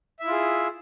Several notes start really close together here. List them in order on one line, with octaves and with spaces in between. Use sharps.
E5 E4 F4 G#4